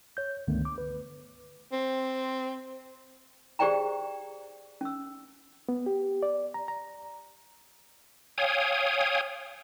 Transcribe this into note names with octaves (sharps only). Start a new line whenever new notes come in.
C#5 G6
C#2 G2 D3 D#3 A3 B3
D6
B4
C4
G4 G#4 C5 D5 G5 A#5
C#4 E6
B3
G4
D5
A#5
A#5
C#5 F5 G5 G#5 D#6